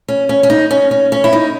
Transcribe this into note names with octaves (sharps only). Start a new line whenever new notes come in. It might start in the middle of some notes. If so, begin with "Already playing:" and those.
C#4
C#4
C#4
D#4
C#4
C#4
C#4
E4
D#4